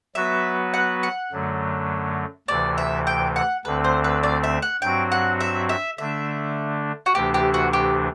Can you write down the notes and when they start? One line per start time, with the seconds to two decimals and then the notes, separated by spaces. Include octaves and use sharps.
0.15 F#3 B3 F#4 B4 E5
0.74 F#5
1.03 F#5
1.32 F#2 D3 F#3 A3
2.48 D2 C3 E3 D5
2.78 E5
3.07 G5
3.36 F#5
3.65 D2 D3 A3 C4 B4
3.84 C5
4.04 B4
4.23 D5
4.44 E5
4.62 F#5
4.82 G2 F#3 C4 F#4 G5
5.12 F#5
5.40 E5
5.69 E5
5.98 D3 A3 D4 E5
7.06 F#4
7.15 D2 C3 E3 A3 D4 G4
7.34 G4
7.54 F#4
7.73 G4